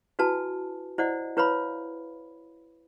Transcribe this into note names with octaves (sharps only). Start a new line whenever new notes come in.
E4 F#4 B4 G#5 A5
E4 C5 D5 D#5 F#5
E4 B4 C#5 F5 B5